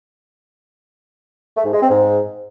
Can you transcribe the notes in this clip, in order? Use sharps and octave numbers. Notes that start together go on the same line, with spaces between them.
A3
G#2
G#3
C4
G#2